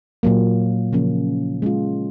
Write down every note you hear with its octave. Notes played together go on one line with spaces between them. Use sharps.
A#2 F#3 A#3
C#3 F3 A#3 C#4
G#3 C#4 F4